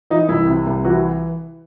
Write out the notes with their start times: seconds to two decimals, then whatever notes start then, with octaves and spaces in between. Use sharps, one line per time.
0.10 E3 D#4
0.29 C2 E4
0.47 C3
0.67 C2
0.85 E3 F#4